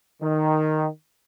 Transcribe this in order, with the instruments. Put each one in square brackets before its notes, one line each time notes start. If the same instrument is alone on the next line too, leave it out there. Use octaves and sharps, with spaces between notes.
[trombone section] D#3